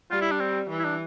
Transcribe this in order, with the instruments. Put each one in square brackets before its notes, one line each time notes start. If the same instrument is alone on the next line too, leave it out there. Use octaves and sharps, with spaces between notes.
[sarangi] G3 [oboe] F4
[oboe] E4
D4
C4
[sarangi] E3
[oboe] E4
D4